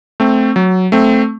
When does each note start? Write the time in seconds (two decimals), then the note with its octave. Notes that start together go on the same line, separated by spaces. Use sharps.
0.20 A3 C4
0.56 F#3
0.92 A3 C4